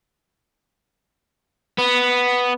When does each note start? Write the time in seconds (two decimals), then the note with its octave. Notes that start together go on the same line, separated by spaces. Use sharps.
1.78 B3